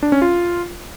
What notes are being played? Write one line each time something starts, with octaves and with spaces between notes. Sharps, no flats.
D4
C#4
F4